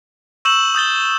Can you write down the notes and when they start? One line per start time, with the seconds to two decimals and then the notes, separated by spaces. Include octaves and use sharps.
0.45 C#6 E6 G6 E7 F#7
0.75 D#6 G6 A6 G7